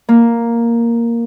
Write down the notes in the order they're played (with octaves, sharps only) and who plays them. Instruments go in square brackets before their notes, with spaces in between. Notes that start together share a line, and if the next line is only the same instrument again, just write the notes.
[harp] A#3